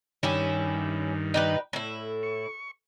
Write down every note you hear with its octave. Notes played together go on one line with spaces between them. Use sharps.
G2 D#3 C#4 E4 G4
D#4 G4 B4
A2 E4
C#6